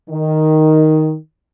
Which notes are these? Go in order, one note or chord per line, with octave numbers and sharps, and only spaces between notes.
D#3